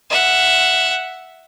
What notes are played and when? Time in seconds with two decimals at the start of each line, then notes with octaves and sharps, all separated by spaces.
0.10 E5 F#5